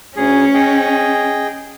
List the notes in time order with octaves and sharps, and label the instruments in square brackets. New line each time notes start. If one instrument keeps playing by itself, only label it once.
[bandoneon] D2 G#4 [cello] C#4
[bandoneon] G#4 D#5 G5